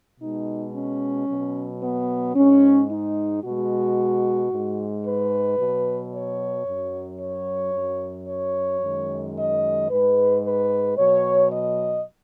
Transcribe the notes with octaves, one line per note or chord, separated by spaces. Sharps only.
B2 G#3 D#4
C#4
B2 F#3
B3
G#2 G#3 C#4
D#4
B2 G#3 F#4
G#2 G#3
B4
B2 F#3
C#5
F#2 F#3
C#5
F#2 F#3
C#5
F#2 D#3 G#3
D#5
G#2 G#3 B4
B4
B2 F#3 C#5
D#5